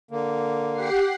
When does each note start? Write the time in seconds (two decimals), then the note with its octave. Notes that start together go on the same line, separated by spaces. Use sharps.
0.11 D3 A#3
0.73 G4 F#5 C7